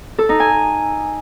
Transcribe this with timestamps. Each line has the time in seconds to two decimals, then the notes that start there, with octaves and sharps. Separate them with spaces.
0.18 A4
0.29 D#4
0.40 G#5